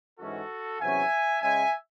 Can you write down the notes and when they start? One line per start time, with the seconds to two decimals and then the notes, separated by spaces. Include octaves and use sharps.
0.20 G#2 E3 G#3 C#4 F#4 A4
0.80 E2 C3 F#3 C#4 E5 G#5
1.42 C#3 G#3 C#4 E5 G#5